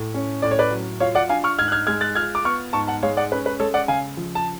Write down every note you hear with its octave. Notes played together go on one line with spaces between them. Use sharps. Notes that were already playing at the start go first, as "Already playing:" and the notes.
Already playing: A2
C#4
A2 D5
C#5
B4 D5
F#3
F4 C#5 F5
D5 F#5
D4 F5 G#5
C#6 F6
G#2 F6 G#6
F#6
F6 G#6
G#3 F6 G#6
F#6 A6
F4 F6 G#6
D6
B3 C#6 F6
G#2 A5 C#6
F#5 A5
G#3 C#5 F5
D5 F#5
C#4 B4
B4
G#3 A4 C#5
D5 F#5
C#3 F5 G#5
F3
A5